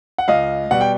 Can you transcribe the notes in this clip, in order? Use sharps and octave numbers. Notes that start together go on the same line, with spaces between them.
F#5
C#2 D#5 F5
B2 G3 F#5
G5